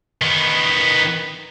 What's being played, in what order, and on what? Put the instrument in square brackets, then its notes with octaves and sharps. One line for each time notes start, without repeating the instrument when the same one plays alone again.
[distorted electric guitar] D#3 B3